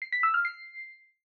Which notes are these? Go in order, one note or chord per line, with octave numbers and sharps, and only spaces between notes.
C7
B6
E6
F6
C7